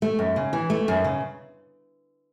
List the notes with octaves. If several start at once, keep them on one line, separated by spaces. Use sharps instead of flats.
A3
F#2
C#3
E3
A3
F#2
C#3